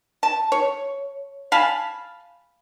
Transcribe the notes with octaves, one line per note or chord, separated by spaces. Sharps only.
A5
C#5
F5 G#5 A5 B5